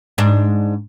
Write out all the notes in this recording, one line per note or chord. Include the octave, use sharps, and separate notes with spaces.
G#2 D4